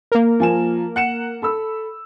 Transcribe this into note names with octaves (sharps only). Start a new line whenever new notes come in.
A#3 A#4
F3 G#5 E7
F#5 C#7 E7
A4 B5 E6